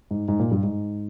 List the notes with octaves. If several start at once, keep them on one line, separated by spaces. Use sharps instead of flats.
G#2
G#2
A#2
G2
G#2